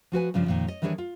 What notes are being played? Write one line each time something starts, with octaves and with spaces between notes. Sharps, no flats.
F3 F#4 B4 G#5
G2 C#3 F3 D4
F2 A#2 D#3
C#5 D#5
D#3 E3 G3 D4 G#4 C#5
F4